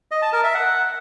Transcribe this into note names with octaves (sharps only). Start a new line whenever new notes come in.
D#5
A5
A#4
E5
F#5